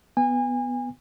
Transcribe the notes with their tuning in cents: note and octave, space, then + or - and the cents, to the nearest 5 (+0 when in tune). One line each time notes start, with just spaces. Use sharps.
B3 +5 G#5 -30